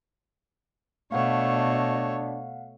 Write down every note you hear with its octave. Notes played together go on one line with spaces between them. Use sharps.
B2 A3 D4 C#5 F5 F#5